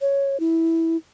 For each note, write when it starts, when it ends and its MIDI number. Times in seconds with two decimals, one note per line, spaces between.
0.01 0.39 73
0.40 0.97 64